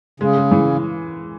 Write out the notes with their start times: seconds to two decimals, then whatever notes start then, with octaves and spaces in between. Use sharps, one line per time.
0.20 C#3 G#3
0.37 G#3
0.52 E3